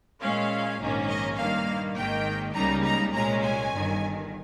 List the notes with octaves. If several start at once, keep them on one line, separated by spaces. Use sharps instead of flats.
A#2 G#3 C#4 F5
A#1 G#2 D#3 A#3 C#4
D#5
G2 D#3 A#3 F5
G#1 G#2 D#3 A#3 G5
C#2 C#3 G3 A#3 D#4 A#5
A#5
C2 A#2 G#3 C#4 A#5
G#5
G1 G2 D#3